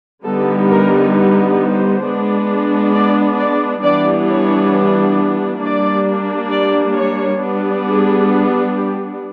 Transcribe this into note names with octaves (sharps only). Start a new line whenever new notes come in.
D3 G3 B3 D#4 A4
A#4
C5
G#3 B3 D4
D5
D5
E3 G3 B3 D4 D5
C#5
G3 A#3 D4 D5
D5
C#5
G3 B3 D4
G#4
G4